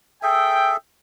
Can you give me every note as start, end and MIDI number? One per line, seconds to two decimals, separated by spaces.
0.23 0.77 68
0.23 0.77 69
0.23 0.77 76
0.23 0.74 79